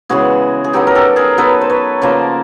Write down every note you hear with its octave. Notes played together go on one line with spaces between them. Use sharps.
C#3 E3 G#3 B3 F#4 G#4
G#4
F#3 B3 D#4 G4 A4
A#4
G4 A4
G#4 A#4
F#3 B3 D#4 A4 B4
C5
B4 C#5
C#3 F3 A#3 C5 D5